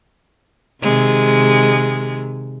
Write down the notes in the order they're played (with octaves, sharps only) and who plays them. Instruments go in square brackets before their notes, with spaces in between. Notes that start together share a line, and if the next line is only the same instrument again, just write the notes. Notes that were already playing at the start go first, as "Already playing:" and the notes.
[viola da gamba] C3 D#3 G#3